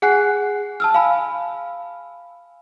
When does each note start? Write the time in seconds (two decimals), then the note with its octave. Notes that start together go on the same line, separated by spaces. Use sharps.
0.02 G#4 F#5 G#5 F#6 C7
0.80 A5 E6 F6
0.94 F5 G#5 B5